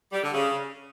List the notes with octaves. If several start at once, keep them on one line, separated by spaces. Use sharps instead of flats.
G3
D3
C#3